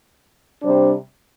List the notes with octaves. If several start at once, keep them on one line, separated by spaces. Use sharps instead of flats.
C3 G3 D4 C5